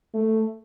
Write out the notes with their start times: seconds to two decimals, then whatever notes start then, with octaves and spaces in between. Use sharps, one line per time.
0.14 A3